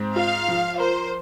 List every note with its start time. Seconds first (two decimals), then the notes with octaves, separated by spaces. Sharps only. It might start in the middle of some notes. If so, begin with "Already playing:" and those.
Already playing: G#2 C4
0.16 F4 F5
0.48 F3
0.79 A#4 C5